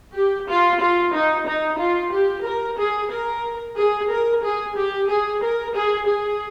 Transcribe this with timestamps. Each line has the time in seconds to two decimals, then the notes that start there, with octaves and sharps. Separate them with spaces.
0.15 G4
0.49 F4
0.81 F4
1.14 D#4
1.47 D#4
1.80 F4
2.13 G4
2.46 A#4
2.78 G#4
3.12 A#4
3.78 G#4
4.11 A#4
4.43 G#4
4.77 G4
5.09 G#4
5.42 A#4
5.75 G#4
6.08 G#4